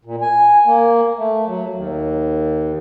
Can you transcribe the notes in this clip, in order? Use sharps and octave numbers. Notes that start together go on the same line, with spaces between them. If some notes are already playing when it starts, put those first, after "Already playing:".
A#2
G#5
A#3
A3
F#3
D#2